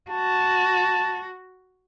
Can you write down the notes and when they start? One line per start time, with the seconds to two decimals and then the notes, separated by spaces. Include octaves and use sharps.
0.10 F#4 A5